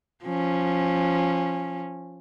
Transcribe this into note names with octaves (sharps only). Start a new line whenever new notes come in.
F3 C#4